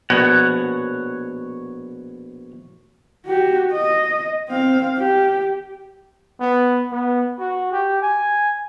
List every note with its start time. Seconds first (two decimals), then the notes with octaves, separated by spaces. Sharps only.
0.10 A#1 B2 C#5 F#5
3.26 F#4 G4
3.73 D#5
4.48 C4 F5
4.98 G4
6.40 B3
6.91 B3
7.39 F#4
7.72 G4
8.02 G#5